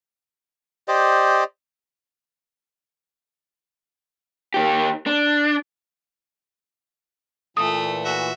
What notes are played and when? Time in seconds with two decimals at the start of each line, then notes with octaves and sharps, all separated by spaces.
0.88 G4 C5 D5 D#5
4.54 D#3 G4
5.07 D4
7.57 A#2 E3 A3 D#6
8.05 F#4 E5